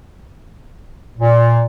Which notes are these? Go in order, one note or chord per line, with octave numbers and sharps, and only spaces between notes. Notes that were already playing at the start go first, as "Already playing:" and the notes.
A#2